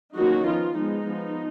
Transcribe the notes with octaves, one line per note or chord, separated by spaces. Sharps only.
D#3 F#3 A#3 C#4 D#4 F#4
F3 B3 F4
F3 G#3 B3 D#4
F3 B3